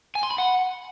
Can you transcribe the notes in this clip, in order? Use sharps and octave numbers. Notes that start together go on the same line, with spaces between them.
G#5
C6
B5
F#5